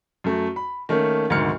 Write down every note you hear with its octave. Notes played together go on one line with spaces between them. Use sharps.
F#2 A3
B5
D#3 A3 A#3 C#4
F1 D2 G#2 D#3 F6 C#7